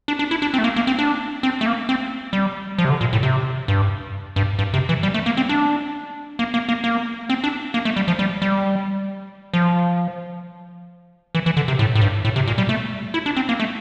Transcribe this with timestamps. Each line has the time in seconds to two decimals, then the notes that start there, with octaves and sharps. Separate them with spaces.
0.08 D4
0.19 D4
0.31 E4
0.42 D4
0.54 C4
0.59 A3
0.64 A#3
0.76 A#3
0.87 C4
0.99 D4
1.43 C4
1.61 A3
1.66 A#3
1.89 C4
2.33 G3
2.78 F3
2.85 C3
2.90 D3
3.01 A#2
3.13 A2
3.23 C3
3.68 G2
4.36 G2
4.59 G2
4.74 C3
4.89 E3
5.03 G3
5.14 A3
5.26 A#3
5.37 C4
5.49 D4
6.39 A#3
6.54 A#3
6.69 A#3
6.84 A#3
7.30 C4
7.44 D4
7.74 A#3
7.85 A3
7.96 G3
8.08 F3
8.19 G3
8.42 G3
9.54 F3
11.35 E3
11.46 E3
11.57 D3
11.68 C3
11.79 A2
11.95 A2
12.02 G2
12.25 A2
12.36 C3
12.47 A#2
12.58 G3
12.69 A3
13.14 E4
13.26 D4
13.36 C4
13.49 A#3
13.60 A3